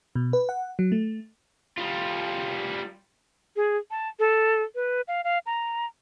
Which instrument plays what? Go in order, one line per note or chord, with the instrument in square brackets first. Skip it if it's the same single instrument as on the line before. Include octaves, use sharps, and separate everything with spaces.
[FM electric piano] B2
B4
F#5
F#3
A3
[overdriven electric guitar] G3 F4
[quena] G#4
A5
A4
B4
F5
F5
A#5